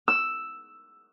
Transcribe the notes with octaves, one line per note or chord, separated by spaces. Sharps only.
E6